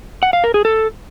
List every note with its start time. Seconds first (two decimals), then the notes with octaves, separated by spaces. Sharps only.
0.23 F#5
0.33 F5
0.44 A#4
0.54 G#4
0.65 A4